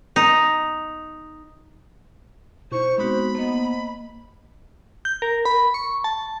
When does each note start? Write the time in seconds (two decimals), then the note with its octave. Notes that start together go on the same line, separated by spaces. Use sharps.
0.16 D#4
2.72 B2 D#4 E4 C5 C#6
2.98 G#3 B3 C4 D#4 F#4 B5
3.35 A#3 B3 C5 D#5
5.05 G6
5.22 A#4
5.45 B5
5.74 C#6
6.04 A5